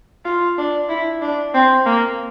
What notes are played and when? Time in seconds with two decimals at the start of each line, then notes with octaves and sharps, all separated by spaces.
0.25 F4
0.58 D4
0.90 E4
1.21 D4
1.54 C4
1.86 A#3